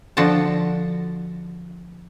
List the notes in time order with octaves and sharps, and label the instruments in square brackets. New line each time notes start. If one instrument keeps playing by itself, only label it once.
[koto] D3 F3 F#4 A5